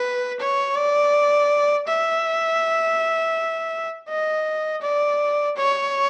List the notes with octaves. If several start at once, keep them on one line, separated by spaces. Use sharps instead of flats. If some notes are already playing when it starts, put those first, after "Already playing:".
Already playing: B4
C#5
D5
E5
D#5
D5
C#5